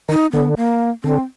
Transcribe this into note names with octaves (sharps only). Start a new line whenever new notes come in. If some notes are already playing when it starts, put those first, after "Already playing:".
D#3 D#4
D3 B3
A#3
D3 C4